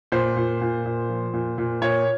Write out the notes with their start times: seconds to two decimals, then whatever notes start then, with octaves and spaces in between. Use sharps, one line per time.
0.12 A#2 C5
0.37 A#2
0.61 A#2
0.86 A#2
1.09 F3
1.33 A#2
1.58 A#2
1.82 A#2 C#5